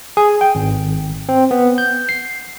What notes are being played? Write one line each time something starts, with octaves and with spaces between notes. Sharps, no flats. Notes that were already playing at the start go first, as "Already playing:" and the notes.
G#4
G5
G#1
C4
B3
G6
C7